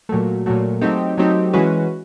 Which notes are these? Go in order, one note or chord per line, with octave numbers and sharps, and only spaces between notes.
A#2 F#3 A3
A#2 F#3 A3
F#3 A3 C4 D#4 G4
F#3 A3 C4 D#4 G4
E3 G#3 C#4 F#4 B4